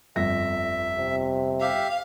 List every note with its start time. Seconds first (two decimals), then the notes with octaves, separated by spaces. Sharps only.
0.16 G1 F2 E5 A#6
0.98 C3
1.61 G4 E5 F5